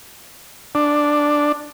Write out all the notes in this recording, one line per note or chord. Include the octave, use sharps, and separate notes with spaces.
D4